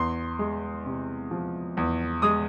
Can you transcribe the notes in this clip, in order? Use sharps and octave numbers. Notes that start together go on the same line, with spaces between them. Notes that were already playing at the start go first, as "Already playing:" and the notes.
Already playing: E2 C6
G#3
C3
F3
E2
G#3 D#6